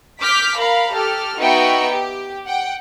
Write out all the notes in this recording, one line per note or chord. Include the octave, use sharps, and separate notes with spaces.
D6 F6 G6 B6
A#4 F5 A#5 B5
G4 A4 F6
B3 D#4 F#4 E5 G5 C#7
G4
F#5 G5